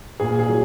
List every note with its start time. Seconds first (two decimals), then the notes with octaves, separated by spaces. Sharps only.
0.20 A#2 G#4
0.39 G#4
0.49 F#3